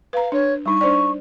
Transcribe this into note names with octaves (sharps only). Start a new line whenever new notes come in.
B4 F5 A#5
D4 C#5
G3 D#4 C#6
D4 C5 D5